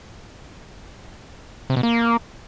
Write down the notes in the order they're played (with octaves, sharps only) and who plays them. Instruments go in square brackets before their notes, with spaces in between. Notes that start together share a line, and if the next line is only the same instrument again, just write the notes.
[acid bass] C3
B2
A#3